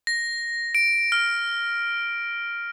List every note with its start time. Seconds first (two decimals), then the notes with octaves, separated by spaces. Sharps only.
0.07 A#6
0.75 D7
1.12 F6